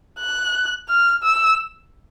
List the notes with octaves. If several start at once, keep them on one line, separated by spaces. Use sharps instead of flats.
F#6
F6
E6